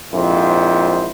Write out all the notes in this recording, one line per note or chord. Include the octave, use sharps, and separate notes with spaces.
A#1 F2 G#2 E4 C5